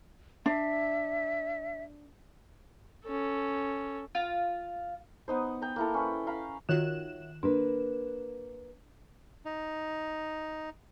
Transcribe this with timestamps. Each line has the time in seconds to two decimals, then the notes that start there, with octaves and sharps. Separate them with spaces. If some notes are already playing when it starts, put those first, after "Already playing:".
0.46 D4 E5
3.06 C#4 A4
4.15 F4
5.28 B3 D#4 C5
5.62 G5 A#5
5.76 A#3 E4 A4
5.94 C#4 B4
6.27 F5 A#5 B5
6.69 D#3 F4 F#4 C#5 E5 F#6 E7
7.43 A#3 D4 A#4 B4
9.45 D#4